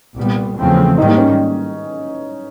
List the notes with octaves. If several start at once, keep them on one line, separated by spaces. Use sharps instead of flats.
C2 A#2 G3 B3
E2 C#3 F3 A3 C4
G#2 D#3 G3 A#3 D#4
D#4
C#4